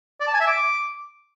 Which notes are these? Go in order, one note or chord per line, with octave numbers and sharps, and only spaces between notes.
D5
A5
G#5
E5
D6